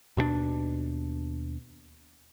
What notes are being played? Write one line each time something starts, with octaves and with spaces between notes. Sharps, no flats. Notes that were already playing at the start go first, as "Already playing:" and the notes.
D#2 B2 G3 D4